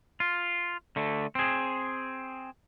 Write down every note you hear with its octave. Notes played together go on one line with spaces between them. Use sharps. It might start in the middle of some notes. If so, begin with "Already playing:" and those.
F4
D3 A3
C4 G#4